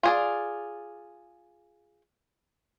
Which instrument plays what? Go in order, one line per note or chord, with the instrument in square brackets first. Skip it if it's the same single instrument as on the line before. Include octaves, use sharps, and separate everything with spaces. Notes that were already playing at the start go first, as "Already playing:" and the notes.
[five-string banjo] F4 G#4 D5